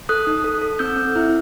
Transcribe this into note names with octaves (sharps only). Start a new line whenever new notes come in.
A4 D#6 F#6
D#4
A4
A4
C4 E6 G6
C4
E4